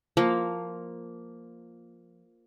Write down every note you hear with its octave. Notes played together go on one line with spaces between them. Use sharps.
F3 A#3